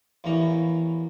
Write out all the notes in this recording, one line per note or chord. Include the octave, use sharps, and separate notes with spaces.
A1 E2 E3 A#3 A#5 C#6